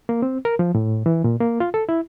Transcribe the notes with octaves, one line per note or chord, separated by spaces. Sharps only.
A#3
C4
A#4
F3
A2
E3
A#2
A#3
F4
A4
E4